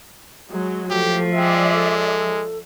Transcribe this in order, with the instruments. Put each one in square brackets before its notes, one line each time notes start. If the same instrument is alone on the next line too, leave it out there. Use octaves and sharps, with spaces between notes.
[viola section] F#3 G#3
[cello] F3 [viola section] A3 [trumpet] G4
[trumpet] G#3 [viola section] D5 E5 [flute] G5
[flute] A4